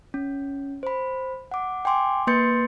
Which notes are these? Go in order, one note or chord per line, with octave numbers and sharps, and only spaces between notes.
C#4
C5 B5
F#5 D6
G5 G#5 C6 D6
A#3 B4 C6 G6 A6 C#7